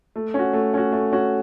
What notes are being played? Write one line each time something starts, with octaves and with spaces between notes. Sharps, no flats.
A3
C#4 F#4
A3
C#4 F#4
A3
C#4 F#4